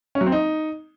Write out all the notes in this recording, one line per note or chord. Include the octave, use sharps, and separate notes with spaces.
C#4
F#3
C4
D#4